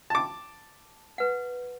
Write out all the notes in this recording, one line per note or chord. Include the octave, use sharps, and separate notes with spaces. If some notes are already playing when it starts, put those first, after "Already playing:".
A5 D6
B4 F#5